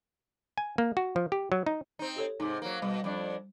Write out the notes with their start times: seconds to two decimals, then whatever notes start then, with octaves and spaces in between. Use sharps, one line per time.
0.58 G#5
0.78 A#3
0.97 F#4
1.16 F3
1.32 G4
1.52 F#3
1.66 D#4
1.99 C4 D#4
2.16 G4 A4 C#5
2.40 G#2 C3 D#4
2.62 F#3 A#3
2.82 B2 G3
3.04 F2 D4